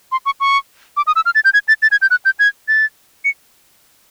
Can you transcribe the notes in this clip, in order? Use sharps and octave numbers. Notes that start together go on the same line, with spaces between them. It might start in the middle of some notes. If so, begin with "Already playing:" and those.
C6
C#6
C#6
D6
D#6
E6
F6
A6
G6
G#6
A6
A6
G#6
G6
F#6
G6
G#6
A6
C#7